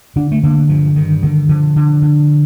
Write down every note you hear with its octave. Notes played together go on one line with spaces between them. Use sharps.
D3 D4
A3
D3 A#3
G2 F3
G2 D#3
D3 D#3
D3 F3
D3
D3